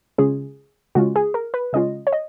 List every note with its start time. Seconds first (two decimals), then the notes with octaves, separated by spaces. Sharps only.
0.18 C#3 G#3 C#4 F4 G#4
0.95 C#3 G#3 C#4 F4 F#4
1.16 G#4
1.34 A#4
1.54 B4
1.73 C#3 G#3 C#4 F4 D#5
2.07 C#5
2.13 D#5